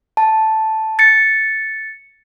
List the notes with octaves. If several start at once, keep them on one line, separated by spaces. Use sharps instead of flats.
A5
A6 C#7